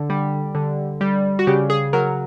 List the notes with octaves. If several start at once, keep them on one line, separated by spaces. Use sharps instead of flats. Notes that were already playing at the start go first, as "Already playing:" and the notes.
Already playing: D3
G3
D3
G3
F#4
C#3 G4
G#4
F#3 A#4